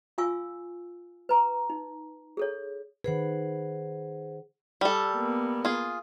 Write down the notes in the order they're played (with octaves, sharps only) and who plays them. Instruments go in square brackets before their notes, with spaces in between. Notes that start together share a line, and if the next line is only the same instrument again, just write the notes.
[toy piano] F4 F5 G#5 C#6 E6
B4 A#5
D#4
G#4 A4 C#5
[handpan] D#3 B4 [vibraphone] G#4 C5 F#5
[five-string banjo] G3 A4
[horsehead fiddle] A#3 B3
[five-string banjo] F4 G#4